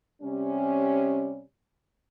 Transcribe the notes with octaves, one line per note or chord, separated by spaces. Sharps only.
C3 G3 C#4